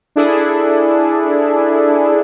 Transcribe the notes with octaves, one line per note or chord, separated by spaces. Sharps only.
D4 E4 G#4 A4